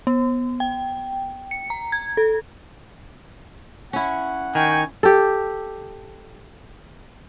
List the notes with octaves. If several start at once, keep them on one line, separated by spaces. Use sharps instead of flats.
B3
G5
C#7
A#5
G#6
A4
C#4 E4 F#5
D#3 G5 G#5 C#6
G4 A4